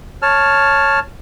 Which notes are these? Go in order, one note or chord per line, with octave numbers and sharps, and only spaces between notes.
C#5 A5 F6